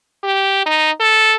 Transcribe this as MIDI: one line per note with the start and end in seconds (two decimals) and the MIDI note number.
0.24 0.65 67
0.66 0.91 63
1.00 1.35 69